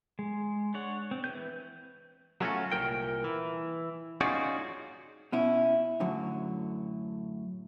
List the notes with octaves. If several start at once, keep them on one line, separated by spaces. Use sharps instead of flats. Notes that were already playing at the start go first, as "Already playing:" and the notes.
G#3
D4 C#5 F#5
C4
E3 B4 G6
F#3 A3 C#4 D#4 F4 F#4
C2 A#2 F#3 C#4 A#4 G5
E3
C#4 D#4 F4 F#4 G#4 D5
B2 C#4 E4
F#2 A2 D3 F#3